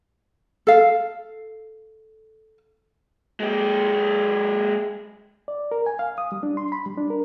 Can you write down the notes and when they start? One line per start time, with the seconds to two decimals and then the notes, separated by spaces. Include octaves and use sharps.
0.67 A4 F5
3.40 G#3 G4
5.48 D5
5.71 A#4
5.86 G#5
5.99 F5
6.18 D#6
6.32 G3
6.43 D4
6.57 C6
6.72 B5
6.86 G3
6.98 D4
7.10 A#4